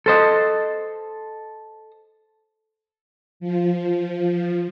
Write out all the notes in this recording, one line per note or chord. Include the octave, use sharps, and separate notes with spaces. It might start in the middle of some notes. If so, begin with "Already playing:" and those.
A4 C5 D#5
F3